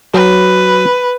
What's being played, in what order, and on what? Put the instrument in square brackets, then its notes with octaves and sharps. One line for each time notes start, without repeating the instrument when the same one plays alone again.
[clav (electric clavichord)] F#3 [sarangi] B4